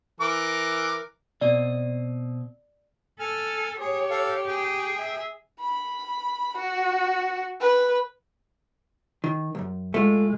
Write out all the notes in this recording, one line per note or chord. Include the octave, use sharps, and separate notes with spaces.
E3 A#4 D6
B2 C4 D5 D#5
A4 G#5 F6
G4 G#4 C#5
A4 F5
G#4 G5
E5
B5
F#4
B4
D#3
C2 F#2
G#3 A3 F4